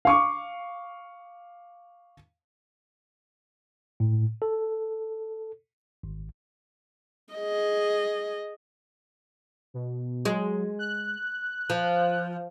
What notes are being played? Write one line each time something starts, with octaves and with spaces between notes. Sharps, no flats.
F5 C#6 D6
A2
A4
G#1
G#4 D#5
B2
F#3 G#3
F#6
F3